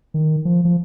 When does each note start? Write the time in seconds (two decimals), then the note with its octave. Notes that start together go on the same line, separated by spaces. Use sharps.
0.14 D#3
0.45 F3
0.65 F3